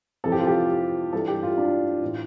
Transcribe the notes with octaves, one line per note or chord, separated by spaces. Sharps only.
F2 C3 E3 A4
G4
F4
G4
G2 E3 A4
G4
F4
D4
A2 E3